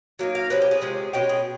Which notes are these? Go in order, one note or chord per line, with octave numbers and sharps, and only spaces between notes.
F#3 A#3 D#4
F5
C3 F3 C#4 B4
G4
G#4
C3 F3 G#3 C#4
B2 G#3 C#4 G4
G#4